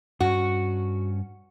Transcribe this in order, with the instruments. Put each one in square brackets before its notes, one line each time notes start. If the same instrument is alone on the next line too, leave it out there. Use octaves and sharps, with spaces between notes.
[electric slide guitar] G2 C#4 [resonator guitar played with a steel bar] F#4